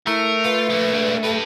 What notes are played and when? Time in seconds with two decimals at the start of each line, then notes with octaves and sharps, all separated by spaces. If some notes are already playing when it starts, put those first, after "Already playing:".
0.07 A3 E4 A#4
0.44 F4 B4
0.69 F3 A#3
0.94 G#3 D4
1.23 G4 A4 B4